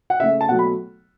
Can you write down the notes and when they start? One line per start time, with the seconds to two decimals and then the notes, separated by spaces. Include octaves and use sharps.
0.10 F#5
0.20 C#3 A3 E5
0.41 A5
0.49 B2 F#3 A3 F#5
0.59 B5